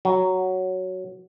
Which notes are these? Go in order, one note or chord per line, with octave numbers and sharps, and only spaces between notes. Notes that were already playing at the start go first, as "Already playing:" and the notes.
F#3